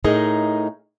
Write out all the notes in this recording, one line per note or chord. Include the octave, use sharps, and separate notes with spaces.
A2 D#4 G#4 A#4 D#5